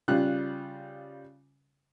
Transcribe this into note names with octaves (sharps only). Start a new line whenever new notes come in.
C#3 G3 F4 F#6